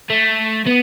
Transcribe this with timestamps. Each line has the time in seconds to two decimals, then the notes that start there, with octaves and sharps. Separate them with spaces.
0.10 A3
0.66 B3